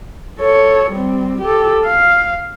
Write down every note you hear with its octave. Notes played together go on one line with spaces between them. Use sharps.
A4 C#5
G3 C4
G4 A4
F5